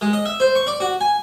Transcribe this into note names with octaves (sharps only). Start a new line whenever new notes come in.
G#3
D#5
E5
C5
C#6
D5
F#4
G#5